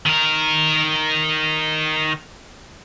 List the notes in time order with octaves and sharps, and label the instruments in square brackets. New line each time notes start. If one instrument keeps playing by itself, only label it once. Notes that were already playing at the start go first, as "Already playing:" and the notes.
[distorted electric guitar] D#3 A#4